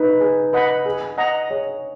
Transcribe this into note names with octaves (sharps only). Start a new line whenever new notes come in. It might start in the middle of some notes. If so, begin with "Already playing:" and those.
Already playing: D#4 B4
G#4
B4 D#5 F#5 B5
G#4
D#5 F#5 A#5
G#4 C#5